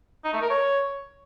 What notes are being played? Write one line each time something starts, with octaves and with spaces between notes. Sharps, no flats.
D#4
A3
A#4
C#5